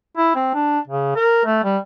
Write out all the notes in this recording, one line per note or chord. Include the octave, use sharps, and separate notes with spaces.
E4
C4
D4
C#3
A#4
A3
G3